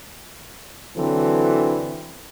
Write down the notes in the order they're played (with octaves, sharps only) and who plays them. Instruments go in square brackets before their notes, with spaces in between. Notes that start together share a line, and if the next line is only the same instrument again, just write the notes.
[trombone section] D3 E3 F#3 C4 A4